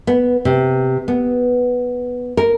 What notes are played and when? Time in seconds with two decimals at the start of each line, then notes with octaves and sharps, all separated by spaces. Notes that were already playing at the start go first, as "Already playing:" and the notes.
0.07 B3
0.45 C3
1.08 B3
2.37 A#4